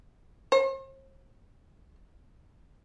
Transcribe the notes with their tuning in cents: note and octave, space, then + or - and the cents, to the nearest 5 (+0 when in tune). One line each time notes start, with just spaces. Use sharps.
C5 +45